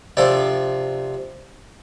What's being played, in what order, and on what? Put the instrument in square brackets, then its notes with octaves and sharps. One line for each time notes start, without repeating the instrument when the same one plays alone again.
[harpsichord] C3 F3 D4 A4 D5